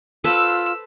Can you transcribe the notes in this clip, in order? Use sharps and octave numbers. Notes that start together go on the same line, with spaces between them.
F4 A4 B4 C5 E6